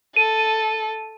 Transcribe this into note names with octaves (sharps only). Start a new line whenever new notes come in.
A4 D#7